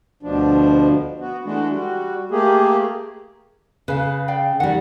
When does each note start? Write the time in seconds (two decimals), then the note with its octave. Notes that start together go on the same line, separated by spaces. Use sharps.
0.23 D2 B2 F3 D4
1.20 B3 F#4
1.45 E3 G#3 A3 D4 F#4
1.70 G3 F#4
2.31 A3 A#3 G4 G#4
3.88 C#3 B4 F5
4.28 D5 F5 G5
4.60 D#3 G3 F#5